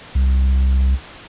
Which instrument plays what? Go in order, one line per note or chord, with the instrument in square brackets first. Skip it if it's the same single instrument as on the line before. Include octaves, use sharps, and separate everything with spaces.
[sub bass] C2